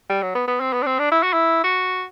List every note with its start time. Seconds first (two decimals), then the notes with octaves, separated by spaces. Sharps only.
0.10 G3
0.22 F#3
0.35 B3
0.48 B3
0.60 C4
0.73 B3
0.83 D4
0.86 C4
0.99 D4
1.11 E4
1.23 F#4
1.33 E4
1.64 F#4